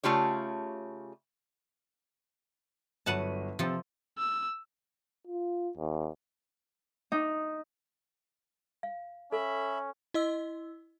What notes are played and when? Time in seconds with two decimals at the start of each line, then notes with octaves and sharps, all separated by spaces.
0.03 C#3 A3 F4 G4 C#5
3.06 G1 F#3 B4 F#5 A5 D#7
3.59 C3 F3 C4 A4
4.18 E6
5.27 F4
5.77 D#2
7.12 D#4
8.83 F5
9.32 C#4 A4 E5 B5
10.14 E4 D#5 E6